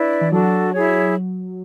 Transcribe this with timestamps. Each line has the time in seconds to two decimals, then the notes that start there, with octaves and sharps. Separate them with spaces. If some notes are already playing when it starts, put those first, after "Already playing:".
Already playing: D4 E4 B4 D5
0.21 E3
0.32 F#3 D4 F#4 A4
0.73 E4 G#4 C#5